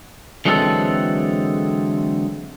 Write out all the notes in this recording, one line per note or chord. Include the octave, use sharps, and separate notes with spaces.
D3 E3 F#3 G#3 C4 A4